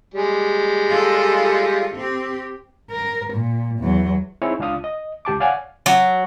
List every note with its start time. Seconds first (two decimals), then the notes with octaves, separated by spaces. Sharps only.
0.14 G3 G#3
0.89 F4 A4
1.95 C4 G4
2.91 A#4
3.34 A#2
3.79 E2 F#3
4.42 C4 D#4 E4 G#4 C#5
4.59 C#2 D4 F4 F5 D#6
4.84 D#5
5.25 C#2 G4 A5 D6
5.40 C#5 D5 F5 F#5 G#5
5.86 F#3